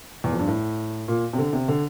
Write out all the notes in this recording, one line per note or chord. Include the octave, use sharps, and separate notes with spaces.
E2
F2
G2
A2
A#2
C3
D3
C3
D3